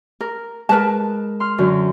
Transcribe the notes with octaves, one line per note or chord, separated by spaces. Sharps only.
A#4
G#3 A#4 B4 A5
C6 F6
F#2 D3 F#3